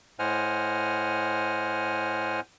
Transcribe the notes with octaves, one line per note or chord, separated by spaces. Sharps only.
A2 C5 D#5 F#5 G#5 F6